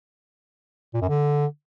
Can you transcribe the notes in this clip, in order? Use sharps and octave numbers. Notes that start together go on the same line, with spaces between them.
A#2
F#2
D3